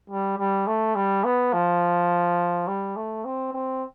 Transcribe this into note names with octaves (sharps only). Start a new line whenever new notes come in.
G3
G3
A3
G3
B3
F3
G3
A3
C4
C4